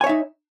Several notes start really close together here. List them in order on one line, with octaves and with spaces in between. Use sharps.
G#5 C#5 E5 D#4